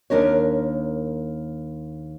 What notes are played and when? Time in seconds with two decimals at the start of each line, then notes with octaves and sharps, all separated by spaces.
0.10 D#2 D4 A#4 C#5